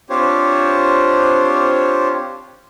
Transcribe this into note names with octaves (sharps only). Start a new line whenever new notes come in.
C4 D4 F4 G4 C5 C#5